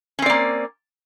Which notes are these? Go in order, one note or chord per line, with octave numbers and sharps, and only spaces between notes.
A#3 C4 C#4 D5